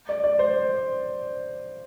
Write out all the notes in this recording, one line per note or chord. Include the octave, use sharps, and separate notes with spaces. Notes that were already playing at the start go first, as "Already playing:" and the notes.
D5
D5
C5